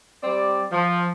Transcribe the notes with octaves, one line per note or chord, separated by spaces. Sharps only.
G3 C4 D5
F3